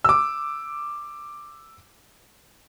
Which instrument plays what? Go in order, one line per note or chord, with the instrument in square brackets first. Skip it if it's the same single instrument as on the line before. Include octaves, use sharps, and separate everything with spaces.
[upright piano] D6 E6